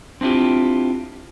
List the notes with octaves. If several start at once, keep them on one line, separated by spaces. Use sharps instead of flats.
C4 D4 E4 F4 G4